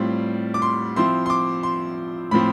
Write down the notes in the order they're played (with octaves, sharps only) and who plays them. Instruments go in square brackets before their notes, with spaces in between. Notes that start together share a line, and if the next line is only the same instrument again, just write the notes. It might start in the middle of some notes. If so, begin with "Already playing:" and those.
Already playing: [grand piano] A2 G3 C4 F4
D6
C6
F3 C4 E4 C6
C6
D6
C6
A2 F3 C4 B5